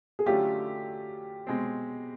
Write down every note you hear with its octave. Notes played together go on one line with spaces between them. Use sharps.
G#4
D3 F#3 A3 C#4 F4 G4
B2 G#3 C4